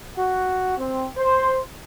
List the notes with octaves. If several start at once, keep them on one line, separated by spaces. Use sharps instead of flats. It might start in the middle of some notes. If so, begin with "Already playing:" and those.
F#4
C4
C5